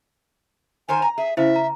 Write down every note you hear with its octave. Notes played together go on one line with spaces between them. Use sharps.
D#3 A#4 C5 G#5
A#5
G#4 E5
C#3 E4 C5 E5
A#5